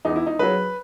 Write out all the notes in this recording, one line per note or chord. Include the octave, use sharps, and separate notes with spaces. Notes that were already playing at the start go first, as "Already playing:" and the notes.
E2 D#4
E4
D#4
C#3 F#3 B4